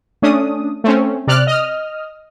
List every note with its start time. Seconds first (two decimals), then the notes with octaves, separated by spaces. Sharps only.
0.22 A3 C#4 D4 D#6
0.84 A3 C4 C#4
1.27 C3 D5 F6 F#6
1.47 D#5 D#6 F6